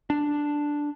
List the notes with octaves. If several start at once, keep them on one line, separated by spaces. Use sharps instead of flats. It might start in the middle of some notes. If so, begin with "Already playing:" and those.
D4